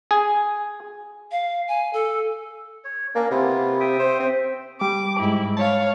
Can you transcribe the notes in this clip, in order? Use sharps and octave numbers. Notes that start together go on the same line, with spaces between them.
G#4
F5
G#5
A4
C#5
A#3 C#4 D4 D5
C3 B3 E4 F4
E5 G5 D#6
C5
C4
G3 D6
G#2 E4
C#5 F5 A5